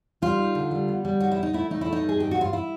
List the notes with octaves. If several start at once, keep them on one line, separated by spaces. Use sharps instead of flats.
G3 F4
D#4
D3
G3
B3
G3
D#4 F#4
E4
B3
D#4
A3 E4
A3 D#4
A3 E4
D#4
G2
G#4
G2 G4
G2 F#4
F4
E4